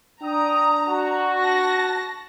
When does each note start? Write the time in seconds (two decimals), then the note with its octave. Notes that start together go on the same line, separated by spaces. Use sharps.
0.22 D4 G5 A#5 D#6
0.87 F#4
1.39 A5 A#6